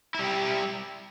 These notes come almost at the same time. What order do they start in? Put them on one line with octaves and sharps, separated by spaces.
E4 G3 G4